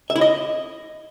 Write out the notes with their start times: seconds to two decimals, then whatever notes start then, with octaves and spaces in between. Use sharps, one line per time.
0.10 E5
0.16 E4
0.21 D#5